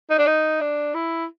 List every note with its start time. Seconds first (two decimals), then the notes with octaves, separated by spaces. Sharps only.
0.10 D#4
0.18 D4
0.27 D#4
0.61 D4
0.94 E4